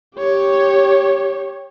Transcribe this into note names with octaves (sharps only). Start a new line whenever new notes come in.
G4 C#5